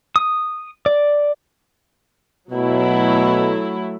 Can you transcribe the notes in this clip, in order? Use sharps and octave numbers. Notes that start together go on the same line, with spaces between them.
D#6
D5
B2 F#3 A3 E4